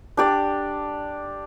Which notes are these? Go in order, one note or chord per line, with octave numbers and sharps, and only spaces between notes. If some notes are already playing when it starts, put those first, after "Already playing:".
D4 G4 D5